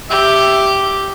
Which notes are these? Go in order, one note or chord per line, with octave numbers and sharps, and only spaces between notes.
G4 E5